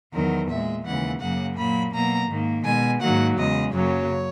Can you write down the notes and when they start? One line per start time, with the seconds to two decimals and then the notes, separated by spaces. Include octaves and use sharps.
0.13 E2 D#3 F#3 A#4
0.49 A#2 G#3 E5
0.85 D#2 C#3 E3 G#3 F#5
1.21 F#2 C#3 F#3 A#3 F#5
1.57 A#2 F#3 A#3 B5
1.93 B2 F#3 A#3 A#5
2.30 G#2 D#3 A#3
2.65 B2 G#3 G#5
3.01 G#2 D#3 F#3 A#3 F#5
3.37 E2 C#3 G#3 D#5
3.73 F#2 C#3 F#3 A#3 C#5